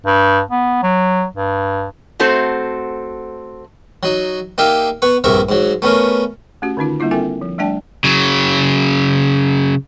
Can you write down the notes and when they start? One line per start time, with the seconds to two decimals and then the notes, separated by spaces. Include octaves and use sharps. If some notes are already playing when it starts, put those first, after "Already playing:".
0.06 G2
0.51 B3
0.83 F#3
1.36 G2
2.20 A3 C4 F#4 A4 C5
4.03 F#3 D#4
4.58 A#3 D#4 G4 E5 F5
5.02 B3 B4 C#6
5.24 A#1 G2 C3 A#4 E5 C#6
5.49 G#2 F#3
5.82 A3 B3 C#4 A#4
6.62 A3 C#4 F#4 G4
6.77 D3 D#3 C#4 D#4 F4
7.00 G3 A#3 D4 E4 F4
7.11 C4 F4 A4 A#4 E5 G5
7.41 F3
7.58 G3 A3 D4 D5 G5 A5
8.04 C#3 F#3